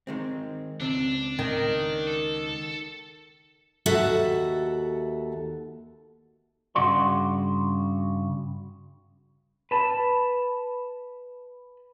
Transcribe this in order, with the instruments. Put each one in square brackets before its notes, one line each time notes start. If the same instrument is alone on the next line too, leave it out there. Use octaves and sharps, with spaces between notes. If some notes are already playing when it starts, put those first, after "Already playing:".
[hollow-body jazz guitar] D#3 G#3 C4
[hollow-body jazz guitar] C#2 C4 [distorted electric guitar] D4
[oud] D#3
[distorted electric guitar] A4
[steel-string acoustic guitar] D#2 F#4 A4 E5 F#5
[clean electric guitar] G2 C#3 F#4 D5 C6
[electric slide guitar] B4 A5